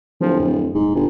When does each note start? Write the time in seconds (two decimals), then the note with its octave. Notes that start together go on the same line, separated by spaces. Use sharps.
0.21 D1 F3
0.40 F2
0.74 D#1 G#2
0.95 G1